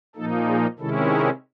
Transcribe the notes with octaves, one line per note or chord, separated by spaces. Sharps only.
A#2 F3 A#3 D#4 A4
G#4
C3 D#3 G#3 C#4 E4 A4
A#4